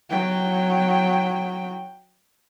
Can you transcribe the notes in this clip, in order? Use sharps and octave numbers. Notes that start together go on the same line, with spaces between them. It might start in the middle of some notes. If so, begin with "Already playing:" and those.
F#3 G5